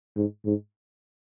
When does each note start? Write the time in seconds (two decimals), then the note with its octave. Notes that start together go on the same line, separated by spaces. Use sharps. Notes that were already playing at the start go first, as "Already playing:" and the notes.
0.16 G#2
0.45 G#2